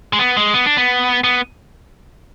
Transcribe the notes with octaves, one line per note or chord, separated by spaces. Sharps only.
G#3
B3
G#3
B3
D4
B3
B3